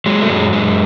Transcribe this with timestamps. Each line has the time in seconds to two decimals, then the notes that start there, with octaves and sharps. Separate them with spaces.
0.06 F#3 G#3
0.21 A3
0.30 F#2 G#3
0.53 F#2 G#3